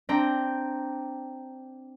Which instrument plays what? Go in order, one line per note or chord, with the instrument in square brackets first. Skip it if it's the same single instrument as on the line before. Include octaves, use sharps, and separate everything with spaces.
[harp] C4 D4 G5 A#5